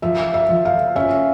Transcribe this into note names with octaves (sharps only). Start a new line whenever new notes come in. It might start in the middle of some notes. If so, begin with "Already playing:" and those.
F3 E5
E5
F3
F5
C#4 E5